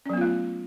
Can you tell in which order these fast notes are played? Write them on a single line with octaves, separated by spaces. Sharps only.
C#4 F#3 B3 F4 A3